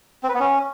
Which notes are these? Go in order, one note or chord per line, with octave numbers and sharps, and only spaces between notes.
C4
B4
B3
C#4